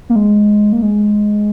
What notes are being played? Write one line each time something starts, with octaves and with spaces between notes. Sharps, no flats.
A#3
G#3
A#3
G#3